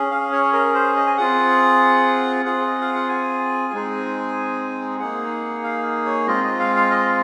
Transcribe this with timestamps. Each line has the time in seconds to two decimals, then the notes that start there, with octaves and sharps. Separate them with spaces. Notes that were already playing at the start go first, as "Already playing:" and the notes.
Already playing: C#4 G#4
0.11 F5
0.32 C#5
0.53 A#4
0.75 C5
0.97 D#5
1.07 G#5
1.17 C4 F4 G#4 F#5
2.45 C4 F4 G#4 F#5
2.67 D#5
2.81 F5
2.94 F#5
3.09 G#5
3.73 G#3 C4 D#4 G#4
4.99 A#3 D#4 G#4 F#5
5.64 F5
6.06 C#5
6.27 G#3 C4 F4 D#5
6.44 D#5
6.59 F5
6.76 F5
6.91 D#5